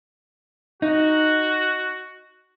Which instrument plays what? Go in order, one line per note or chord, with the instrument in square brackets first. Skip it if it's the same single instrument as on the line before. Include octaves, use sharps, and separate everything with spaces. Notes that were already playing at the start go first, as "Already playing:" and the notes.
[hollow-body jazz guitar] D#4 [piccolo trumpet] F#4